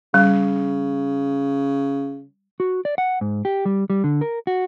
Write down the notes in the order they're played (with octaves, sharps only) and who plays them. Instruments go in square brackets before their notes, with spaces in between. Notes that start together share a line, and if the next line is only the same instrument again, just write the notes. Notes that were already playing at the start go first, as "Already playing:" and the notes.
[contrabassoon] C#3 [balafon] G3
[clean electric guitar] F#4
D5
F#5
G#2
G4
G3
G3
D3
A#4
F#4